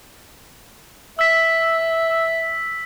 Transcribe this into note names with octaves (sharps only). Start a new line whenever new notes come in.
E5 E6 B6